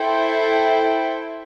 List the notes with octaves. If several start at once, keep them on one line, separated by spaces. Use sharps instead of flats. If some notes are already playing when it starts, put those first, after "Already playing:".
Already playing: E4 A4 C5 G5